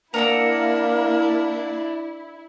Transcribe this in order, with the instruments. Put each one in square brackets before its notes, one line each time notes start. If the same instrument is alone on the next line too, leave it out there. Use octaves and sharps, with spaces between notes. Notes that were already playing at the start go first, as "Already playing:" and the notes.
[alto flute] A#3 [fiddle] D4 [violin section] E4 [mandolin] A#4 F#5 E6